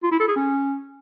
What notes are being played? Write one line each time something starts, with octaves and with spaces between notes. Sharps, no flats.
F4
E4
A4
G#4
C#4